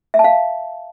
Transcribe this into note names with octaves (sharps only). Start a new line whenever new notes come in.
E5
A5
F5